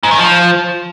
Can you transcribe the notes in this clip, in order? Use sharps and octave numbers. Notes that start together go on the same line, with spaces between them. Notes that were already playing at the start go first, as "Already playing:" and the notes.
G#2
D#3
F3